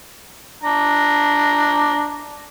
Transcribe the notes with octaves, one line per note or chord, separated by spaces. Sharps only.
D4 A#5